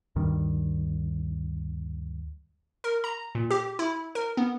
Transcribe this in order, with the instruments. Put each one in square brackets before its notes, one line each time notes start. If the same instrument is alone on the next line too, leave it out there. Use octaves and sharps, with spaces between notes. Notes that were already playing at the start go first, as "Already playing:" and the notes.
[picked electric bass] D2 G2 D#3 G3
[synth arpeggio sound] A#4
A#5
A#2
G4
E4
A#4
B3